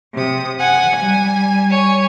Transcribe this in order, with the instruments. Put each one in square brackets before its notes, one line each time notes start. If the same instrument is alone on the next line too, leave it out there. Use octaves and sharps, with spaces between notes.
[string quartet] C3 D#6
[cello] F#5 [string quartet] G#5
[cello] G3
[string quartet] C#5 G#5